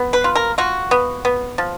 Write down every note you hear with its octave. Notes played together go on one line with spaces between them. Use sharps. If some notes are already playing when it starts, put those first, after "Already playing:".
Already playing: B3
B4
F4
A#4
F4 F#4
B3
B3
F3